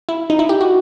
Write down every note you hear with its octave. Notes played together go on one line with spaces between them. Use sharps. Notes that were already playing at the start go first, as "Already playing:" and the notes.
E4
D#4
E4
G4
F#4